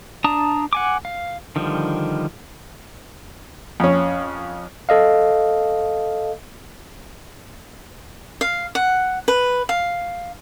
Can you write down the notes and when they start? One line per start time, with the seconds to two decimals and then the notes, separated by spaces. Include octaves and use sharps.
0.24 D4 A5 A#5 D#6
0.73 F#5 G#5 D6
1.05 F5
1.56 D3 D#3 F3 G3
3.80 F2 C#4
4.89 A4 D#5 F5
8.41 F5
8.75 F#5
9.28 B4
9.69 F5